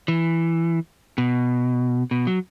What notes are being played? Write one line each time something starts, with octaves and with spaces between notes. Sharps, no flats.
E3
B2
B2
F#3